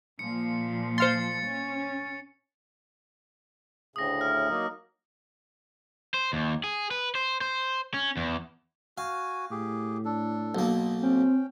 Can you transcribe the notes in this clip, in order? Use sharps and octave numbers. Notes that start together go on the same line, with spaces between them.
A#2 F3 C#7
C5 F5 C6 A6 C#7
C#4
D2 A2 C#3 D#6 A#6
F6
F#3 A#3 D#4
C5
D#2
G#4
B4
C5
C5
C#4
E2
F#4 F5 G#5
A2 G4 G#4
D4 A4
B1 A#3
C4 C#4 G5